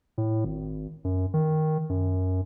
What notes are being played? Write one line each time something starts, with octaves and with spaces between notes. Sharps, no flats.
A2
G#1
F#2
D#3
F#2